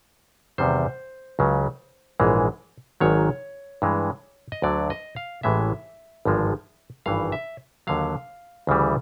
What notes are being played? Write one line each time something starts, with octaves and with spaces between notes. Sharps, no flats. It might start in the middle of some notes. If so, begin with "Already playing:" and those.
E2 C3 D#3 G3 C5
C#2 C#3 F#3
A#1 G#2 E3 G#3
G#1 G#2 D#3 F#3 C#5
G2 E3 G#3
D#5
D2 D3 F#3 D5
D#5
F5
A1 A2 E3 G#3 E5
G#1 G2 D3 F3 G#3
G#1 G2 E3 F5
E5
D#2 D3 F#3 F5
D2 C#3 E3 G3